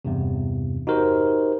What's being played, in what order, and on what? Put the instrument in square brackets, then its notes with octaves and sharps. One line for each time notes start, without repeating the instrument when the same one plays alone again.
[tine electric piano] E2 G2 C3
D#4 F#4 G4 A#4 C5